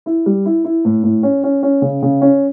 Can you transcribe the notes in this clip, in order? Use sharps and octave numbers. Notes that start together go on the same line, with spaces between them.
E4
G3
E4
E4
A2
A2
C#4
C#4
C#4
C#3
C#3
C#4